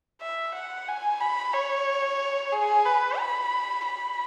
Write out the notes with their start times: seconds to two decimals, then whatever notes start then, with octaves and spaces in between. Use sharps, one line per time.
0.21 E5
0.54 F#5
0.88 G#5
1.21 B5
1.54 C#5
2.52 G#4
2.86 B4
3.18 B5
3.85 B5